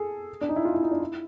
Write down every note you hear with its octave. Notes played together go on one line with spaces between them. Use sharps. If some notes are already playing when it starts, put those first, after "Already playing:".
Already playing: G#4 A4
D4
D#4
E4
F4
E4
D#4
D4
E4